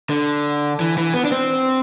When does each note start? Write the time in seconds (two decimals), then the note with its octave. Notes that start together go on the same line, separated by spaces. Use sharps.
0.10 D3
0.80 E3
0.97 E3
1.14 B3
1.25 D4
1.32 C4